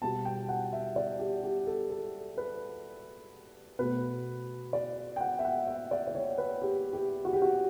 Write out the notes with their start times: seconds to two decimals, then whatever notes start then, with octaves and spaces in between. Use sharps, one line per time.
0.02 B2 G3 B3 A5
0.25 G5
0.49 F#5
0.73 E5
0.96 D5
1.19 G4
1.43 G4
1.67 A4
1.90 A4
2.38 B4
3.79 B2 A3 B4
4.73 D5
5.16 G5
5.21 F#5
5.39 E5
5.45 F#5
5.67 E5
5.91 D5
6.08 D5
6.15 C#5
6.38 B4
6.62 G4
6.93 G4
7.25 F#4
7.33 G4
7.42 F#4